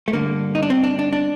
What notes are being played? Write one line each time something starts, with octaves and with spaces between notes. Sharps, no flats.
A3
G2 D3 A#3
D#4
D4
C4
D4
D4
D4